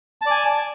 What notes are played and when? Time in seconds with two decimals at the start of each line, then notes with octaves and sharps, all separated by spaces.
0.22 A5
0.26 D5
0.31 G#5